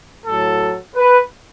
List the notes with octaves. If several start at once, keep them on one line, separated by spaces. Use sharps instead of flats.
A2 F#3 A4
B4